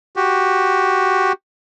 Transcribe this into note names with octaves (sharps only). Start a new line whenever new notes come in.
F#4 G4